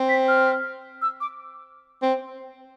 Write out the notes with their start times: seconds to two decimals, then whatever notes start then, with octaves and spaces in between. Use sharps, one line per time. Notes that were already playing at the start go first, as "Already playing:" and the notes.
Already playing: C4
0.09 B6
0.28 F6
1.02 E6
1.21 D6
2.02 C4